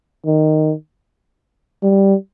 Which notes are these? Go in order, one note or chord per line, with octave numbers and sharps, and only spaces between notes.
D#3
G3